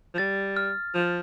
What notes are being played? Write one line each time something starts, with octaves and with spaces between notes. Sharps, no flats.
F3
G3 A6
F6
F3